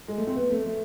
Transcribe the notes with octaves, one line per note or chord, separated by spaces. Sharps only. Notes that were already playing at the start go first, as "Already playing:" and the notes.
G#3
A3
C4
B3
A3
A3